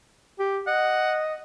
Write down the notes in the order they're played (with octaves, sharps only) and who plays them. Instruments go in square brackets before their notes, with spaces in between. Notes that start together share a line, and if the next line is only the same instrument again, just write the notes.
[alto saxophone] G4
[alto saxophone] D#5 [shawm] F#5